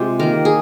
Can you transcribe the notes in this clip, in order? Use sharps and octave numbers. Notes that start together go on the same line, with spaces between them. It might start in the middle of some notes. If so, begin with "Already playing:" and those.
Already playing: C3 G#3 F4 G4
D#3 A#3 A#4
G#4